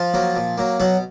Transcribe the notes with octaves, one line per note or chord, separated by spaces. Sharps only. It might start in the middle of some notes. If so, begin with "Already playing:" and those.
Already playing: F3 F4
F#3 A#3
A#2
F#3 A#3
B2 F#3 F#4